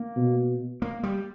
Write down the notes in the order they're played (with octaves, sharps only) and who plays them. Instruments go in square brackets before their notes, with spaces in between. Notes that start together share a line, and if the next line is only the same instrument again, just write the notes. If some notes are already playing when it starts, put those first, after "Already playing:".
Already playing: [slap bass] A#3
[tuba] B2
[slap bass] A#3
G3